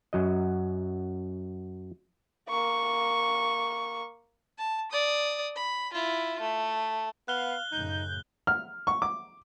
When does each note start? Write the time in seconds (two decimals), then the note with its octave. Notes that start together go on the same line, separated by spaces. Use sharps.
0.13 F#2 F#3 D#5
2.49 A#3 C#6
4.58 A5
4.91 D5 D#6
5.56 B5
5.93 E4 F4
6.40 A3
7.28 B3 F5 F#6 G7
7.72 F#2 A2 C#3 D#4 G6
8.47 F6
8.87 C#6
9.02 D6